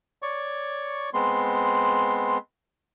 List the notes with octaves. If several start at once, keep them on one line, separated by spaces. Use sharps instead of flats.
C#5 D5 C#6
G#3 B3 C4 C6